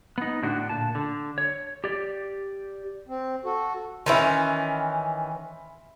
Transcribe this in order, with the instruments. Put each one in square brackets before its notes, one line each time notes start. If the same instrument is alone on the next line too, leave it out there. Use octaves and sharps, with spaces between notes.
[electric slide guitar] B3 D#4
A2 D3 D4 F#4
A#2 A5
D3
C#5
G4 D5
[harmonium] C4
F#4 A4
[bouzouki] D#3 E3 C#4 [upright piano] E5 B5 C6